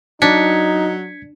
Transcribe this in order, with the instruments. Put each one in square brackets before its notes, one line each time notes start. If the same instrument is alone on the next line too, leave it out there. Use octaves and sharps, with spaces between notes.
[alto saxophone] F#3 [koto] D4 [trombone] D#4 [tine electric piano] G#6 B6 C#7